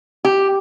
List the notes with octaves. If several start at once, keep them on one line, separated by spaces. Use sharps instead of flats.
G4